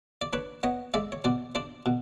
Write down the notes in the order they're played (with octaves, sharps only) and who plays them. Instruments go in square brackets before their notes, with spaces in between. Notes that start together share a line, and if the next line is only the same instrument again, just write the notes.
[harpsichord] D5
D4 B4 C#5
B3 C#5 D#5
G#3 D5 E5
C#5
B2 C5 D5
D4 C5 D5
B2